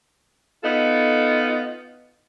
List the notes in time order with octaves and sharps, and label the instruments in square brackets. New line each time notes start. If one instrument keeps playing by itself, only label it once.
[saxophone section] B3 D#4 F4 A4